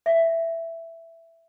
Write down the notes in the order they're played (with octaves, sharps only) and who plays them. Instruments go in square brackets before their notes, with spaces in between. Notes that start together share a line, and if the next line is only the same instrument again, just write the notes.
[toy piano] E5